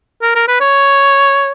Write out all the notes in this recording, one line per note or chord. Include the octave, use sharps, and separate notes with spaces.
A#4
A#4
B4
C#5